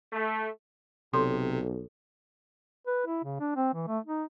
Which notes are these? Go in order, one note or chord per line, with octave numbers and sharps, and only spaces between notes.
A3
B1 C3 A4 C#5 C6
B4
E4
C#3
D4
C4
E3
A3
D#4